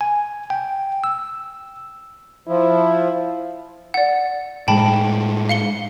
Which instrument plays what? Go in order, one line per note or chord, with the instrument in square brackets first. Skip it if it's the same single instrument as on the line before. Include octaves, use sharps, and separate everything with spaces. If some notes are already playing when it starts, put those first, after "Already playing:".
[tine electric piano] G#5
G5
E6
[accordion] F3 [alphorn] E4
[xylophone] D5 F#5
[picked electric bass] A2 G#3 [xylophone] G5 A5 B5
[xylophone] F5 C#7 G7